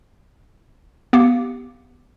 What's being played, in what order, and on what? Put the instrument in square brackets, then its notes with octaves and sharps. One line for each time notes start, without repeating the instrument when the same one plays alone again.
[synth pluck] B3 G4 F5 D6 C#7